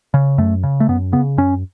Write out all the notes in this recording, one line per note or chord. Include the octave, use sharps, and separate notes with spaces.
C#3
F#2 A3
C#3
A3
F#2 B3
C#3 B3
F#2 C#4